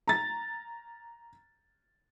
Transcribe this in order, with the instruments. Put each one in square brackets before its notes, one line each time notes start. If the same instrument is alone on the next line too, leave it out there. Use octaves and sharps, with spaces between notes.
[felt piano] A#5 A6